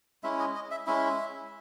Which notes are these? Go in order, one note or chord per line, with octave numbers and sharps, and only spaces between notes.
G#3 C#4 E4 E5
D#5
D#5
E5
G#3 C#4 E4 E5